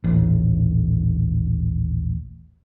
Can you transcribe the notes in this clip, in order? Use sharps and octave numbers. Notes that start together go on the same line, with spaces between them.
D#1 A1